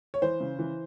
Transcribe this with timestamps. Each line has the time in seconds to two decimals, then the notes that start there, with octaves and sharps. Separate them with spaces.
0.14 C#5
0.22 E3 C5
0.40 C#3
0.59 E3